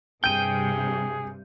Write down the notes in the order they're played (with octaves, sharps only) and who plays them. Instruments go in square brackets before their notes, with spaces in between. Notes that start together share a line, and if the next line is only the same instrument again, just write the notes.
[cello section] G2 C3 [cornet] G#4 [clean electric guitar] G5 [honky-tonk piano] G6 D#7